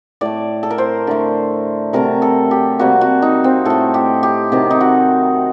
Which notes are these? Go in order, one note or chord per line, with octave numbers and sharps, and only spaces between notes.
A2 A3 D5
A4
A#4
C5
D3 A3
C3 F#3 A3 A#4
A4
G4
C3 G3 A#3 F#4
F#4
D#4
C4
A2 A3 A4
G4
G4
C3 D#3 F#3 G4
D#4
F#4